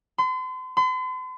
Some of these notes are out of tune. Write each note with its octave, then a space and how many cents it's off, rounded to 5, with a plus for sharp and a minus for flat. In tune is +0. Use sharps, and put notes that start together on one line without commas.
C6 -40
C6 -45